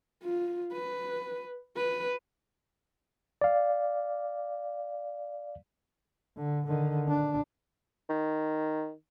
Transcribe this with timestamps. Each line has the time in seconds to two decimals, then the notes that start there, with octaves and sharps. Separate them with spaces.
0.23 F4
0.72 B4
1.76 B4
3.41 D5 F5
6.37 D3
6.67 D3 D#3
7.08 D4
8.09 D#3